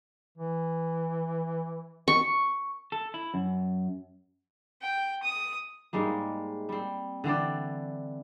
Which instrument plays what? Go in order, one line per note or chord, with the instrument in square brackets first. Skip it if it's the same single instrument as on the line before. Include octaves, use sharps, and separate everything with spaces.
[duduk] E3
[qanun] C#6
[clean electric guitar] A4
E4
F#2
[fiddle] G5
D#6
[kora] G#2 G3 G#3 A#3
G3 C4
D3 E3 C4 D5